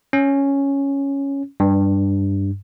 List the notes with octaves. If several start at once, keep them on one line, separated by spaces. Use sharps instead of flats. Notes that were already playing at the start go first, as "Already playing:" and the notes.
C#4
G2